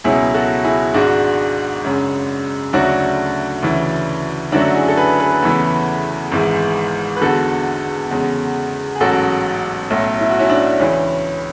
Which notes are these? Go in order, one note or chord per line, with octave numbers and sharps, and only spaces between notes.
C#2 B2 F#3 E4 G#4
F#4 A4
E4 G#4
G#1 G#2 G#3 D4 F#4
F#2 C#3 G#3
D2 C#3 F#3 A3 D4 F#4
D2 C#3 E3
F#2 D3 F#3 A3 D4 F#4
E4 G#4
A4
G#4 B4
G#4 B4
E2 C#3 E3 A3
G#1 G#2 E3 G#3
B4
E2 D3 G#3 F#4 A4
E2 C#3 G#3
G#4
A1 G#2 F#3 F#4 A4
B1 A2 F#3 A3
E4
F#4
C#4 E4
D4
C#2 C#3 E3 C#4